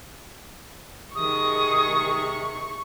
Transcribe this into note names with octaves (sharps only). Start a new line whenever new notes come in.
C3 D#3 G#4 C#6 D#6